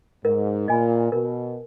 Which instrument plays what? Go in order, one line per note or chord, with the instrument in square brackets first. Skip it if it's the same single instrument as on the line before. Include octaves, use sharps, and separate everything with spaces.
[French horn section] G#2 [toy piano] A#4
[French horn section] A#2 [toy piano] D#5 G#5 B5
[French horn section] B2 [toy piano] A#4